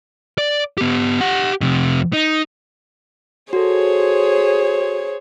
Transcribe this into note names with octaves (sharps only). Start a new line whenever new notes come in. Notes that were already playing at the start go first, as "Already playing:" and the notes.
D5
B3 G4
G4 F#5
F2 C3
D#4
F#4 G#4 A4 C5 C#5